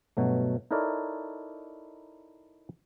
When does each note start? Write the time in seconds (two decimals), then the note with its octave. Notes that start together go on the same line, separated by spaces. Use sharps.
0.17 G2 B2 F#3 A3
0.71 D#4 E4 A4 A#4 C#5 D5